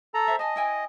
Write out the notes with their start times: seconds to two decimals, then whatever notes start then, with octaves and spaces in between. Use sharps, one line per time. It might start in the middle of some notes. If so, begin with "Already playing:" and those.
0.14 A4 A#5
0.28 C5 E5
0.39 D#5 G#5 A5
0.56 E4 G5 G#5